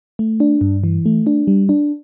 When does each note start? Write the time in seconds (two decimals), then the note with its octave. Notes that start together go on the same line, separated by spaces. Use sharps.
0.19 A3
0.40 D4
0.61 G2
0.84 E3
1.06 A3
1.27 D4
1.47 G3
1.69 D4